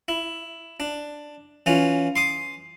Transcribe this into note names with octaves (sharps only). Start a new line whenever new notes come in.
E4
D4
E3 C#4 F4
C6 D6 D#6